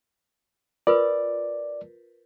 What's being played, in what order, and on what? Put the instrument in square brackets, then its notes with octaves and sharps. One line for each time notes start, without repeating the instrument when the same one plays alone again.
[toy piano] F4 A#4 B4 [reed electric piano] D5